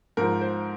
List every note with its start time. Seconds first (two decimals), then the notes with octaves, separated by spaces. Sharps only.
0.17 G#2 F3 A#4
0.41 C5